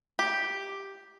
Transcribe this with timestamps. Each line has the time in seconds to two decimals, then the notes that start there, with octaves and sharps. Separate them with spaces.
0.19 G4